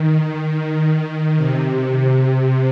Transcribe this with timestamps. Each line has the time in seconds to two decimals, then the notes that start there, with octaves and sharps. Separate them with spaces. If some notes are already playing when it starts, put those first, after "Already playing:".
Already playing: D#3
1.37 C3